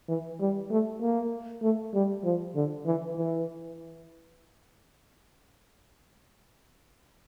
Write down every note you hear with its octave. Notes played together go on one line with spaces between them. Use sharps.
E3
G3
A3
A#3
A3
G3
F3
D3
E3
E3